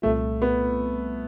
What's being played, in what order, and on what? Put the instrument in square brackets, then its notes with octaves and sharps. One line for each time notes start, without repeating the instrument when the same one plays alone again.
[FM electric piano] C2 A#2 G3 C4 F4 [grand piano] A3
[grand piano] B3